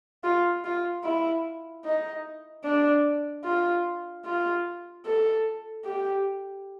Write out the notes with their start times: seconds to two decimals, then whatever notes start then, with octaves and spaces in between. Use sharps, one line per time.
0.24 F4
0.65 F4
1.04 E4
1.85 D#4
2.65 D4
3.44 F4
4.26 F4
5.06 A4
5.85 G4